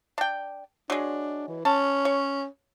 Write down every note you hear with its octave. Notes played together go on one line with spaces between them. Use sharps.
D4 G5
F#3 G#3 D4
E3
C#4 A5
C#5